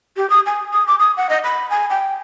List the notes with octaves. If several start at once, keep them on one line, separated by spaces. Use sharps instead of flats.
G4
D#6
G#5
D#6
D6
D#6
F#5
D#5
B5
G#5
G5